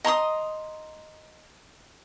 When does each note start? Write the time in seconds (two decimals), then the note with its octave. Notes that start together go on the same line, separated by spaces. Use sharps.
0.05 D#5 A#5 C6 D#6